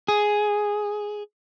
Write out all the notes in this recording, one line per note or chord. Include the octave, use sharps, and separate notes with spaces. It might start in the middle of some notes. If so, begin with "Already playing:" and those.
G#4